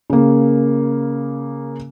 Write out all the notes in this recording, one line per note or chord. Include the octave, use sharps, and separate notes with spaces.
C#3 A#3